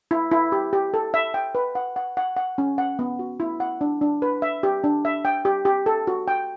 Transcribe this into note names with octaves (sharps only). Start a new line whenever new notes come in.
E4
E4
G4
G4
A4
E5
G5
B4
F#5
F#5
F#5
F#5
C#4
F#5
B3
F#4
E4
F#5
D4
D4
B4
E5
G4
D4
E5
G5
G4
G4
A4
F#4
G5